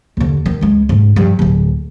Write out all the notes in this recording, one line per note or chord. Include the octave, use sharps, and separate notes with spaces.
D#2 D3
D#3
C#2 G#3
G#2 C#3
G2 F3
D1 D2